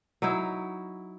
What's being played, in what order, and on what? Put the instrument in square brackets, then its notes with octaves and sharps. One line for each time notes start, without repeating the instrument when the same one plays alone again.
[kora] F#3 D#4 E4